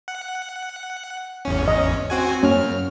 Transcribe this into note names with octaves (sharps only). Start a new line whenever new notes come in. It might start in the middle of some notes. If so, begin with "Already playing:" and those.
F#5
G#1 E2 C#4
D#5
C4 F#4 G#5
F#2 A#3 C#4 F6